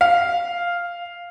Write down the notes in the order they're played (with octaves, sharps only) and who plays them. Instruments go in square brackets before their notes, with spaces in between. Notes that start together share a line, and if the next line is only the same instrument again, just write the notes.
[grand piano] F5